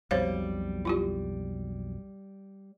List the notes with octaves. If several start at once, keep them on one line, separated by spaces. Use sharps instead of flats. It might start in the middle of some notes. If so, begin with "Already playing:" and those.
B1 F2 B2 G3 C5 C#5 F5
E4 F4 G4